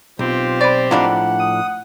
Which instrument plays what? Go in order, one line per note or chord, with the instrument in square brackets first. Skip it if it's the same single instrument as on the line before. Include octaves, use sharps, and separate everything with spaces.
[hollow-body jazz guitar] B1 [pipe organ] C4 G4 [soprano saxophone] F4
[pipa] B4 D5 [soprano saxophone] C5
[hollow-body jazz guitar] A2 F3 D4 [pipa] D#3 G3 A#3 [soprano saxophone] F#5
[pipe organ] D#6